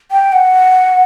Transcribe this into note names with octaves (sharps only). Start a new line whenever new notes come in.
G5
F#5